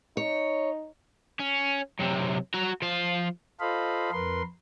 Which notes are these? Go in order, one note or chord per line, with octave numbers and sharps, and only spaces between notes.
D#4 C#5
C#4
F#2 C3
F#4 A#5
F3 F5
F4 A4 C5 D#5 F5 B5
F2 A#4 B4 C6